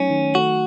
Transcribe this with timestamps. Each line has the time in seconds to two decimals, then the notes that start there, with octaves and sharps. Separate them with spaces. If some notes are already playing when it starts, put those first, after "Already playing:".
Already playing: F#3 A3 C#4 D#4
0.10 D#3
0.35 A3 F#4